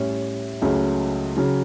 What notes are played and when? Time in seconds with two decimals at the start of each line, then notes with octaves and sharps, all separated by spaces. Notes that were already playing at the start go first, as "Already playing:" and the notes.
Already playing: A2 G3 C#4
0.62 C#2 C#3 F#3 A3
1.37 C#3 F#3